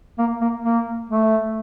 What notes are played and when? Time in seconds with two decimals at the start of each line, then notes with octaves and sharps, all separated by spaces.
0.18 A#3
0.41 A#3
0.64 A#3
1.09 A3